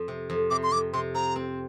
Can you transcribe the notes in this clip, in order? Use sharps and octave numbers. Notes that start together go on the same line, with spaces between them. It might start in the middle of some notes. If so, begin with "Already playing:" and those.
Already playing: F2
C3
F2
C3 D6
C6
F2 D6
C3 C6
C4 A#5
C4